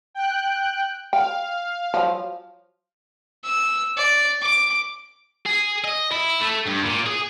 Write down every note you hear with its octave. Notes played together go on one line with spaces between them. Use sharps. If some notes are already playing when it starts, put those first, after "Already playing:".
G5 F#6
F5 G5
F3 F#3
E6
D5
D6
G#4
D#5
E4
A3
G2
A#2
G#4